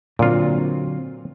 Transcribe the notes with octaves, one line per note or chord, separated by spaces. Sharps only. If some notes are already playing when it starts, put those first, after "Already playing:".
A#2 D3 F#3 C4 F4